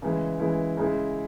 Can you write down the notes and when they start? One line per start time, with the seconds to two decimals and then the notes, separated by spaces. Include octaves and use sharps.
0.02 C#3 E3 G#3 E4
0.40 C#3 E3 G#3 E4
0.77 C#3 G#3 E4